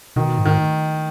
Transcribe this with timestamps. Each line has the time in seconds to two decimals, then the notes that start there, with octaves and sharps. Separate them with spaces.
0.16 B2 D#3
0.38 G#2
0.45 D#3